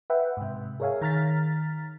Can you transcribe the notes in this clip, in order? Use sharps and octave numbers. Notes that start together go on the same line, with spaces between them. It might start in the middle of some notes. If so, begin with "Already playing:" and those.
B4 E5 F#5 G5
G#2 C3
G#4 A#4 C#5 E5 F5 G#5
D#3 A#5 F6 A6 B6